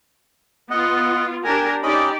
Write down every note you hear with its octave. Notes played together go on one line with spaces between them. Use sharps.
B3 F4 D#5 F#5
D4 G4 A#4 G#5
C#4 D#4 G4 D5 D#5 B5